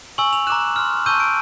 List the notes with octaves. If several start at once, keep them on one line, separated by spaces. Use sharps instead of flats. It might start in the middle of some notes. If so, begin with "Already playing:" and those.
G#5 C#6 E6 F#7
F7
A#5 D6 F#6 E7
C6 F6
A5 C#6 E6 G6 D#7
D7